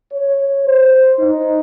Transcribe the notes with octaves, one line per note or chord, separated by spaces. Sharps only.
C#5
C5
D#4